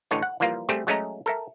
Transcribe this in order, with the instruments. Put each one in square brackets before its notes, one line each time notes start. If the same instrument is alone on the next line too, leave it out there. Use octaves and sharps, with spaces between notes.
[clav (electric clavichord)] A1 A2 D3 C#5 D#5
F#5
E3 F3 G3 A#3 F4
G3 A3 C4 G4 G#4
F#3 G#3 A3 C#4 D#5 A#5
A4 A#4 E5